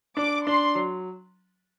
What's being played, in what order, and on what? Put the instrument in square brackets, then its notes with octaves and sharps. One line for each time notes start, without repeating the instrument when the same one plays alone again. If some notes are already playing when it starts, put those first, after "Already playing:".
[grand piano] D4 [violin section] D6
[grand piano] D4 [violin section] C6
[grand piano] F#3